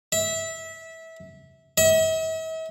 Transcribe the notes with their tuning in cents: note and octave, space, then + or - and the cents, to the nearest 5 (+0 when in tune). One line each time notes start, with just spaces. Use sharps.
E5 -20
E5 -45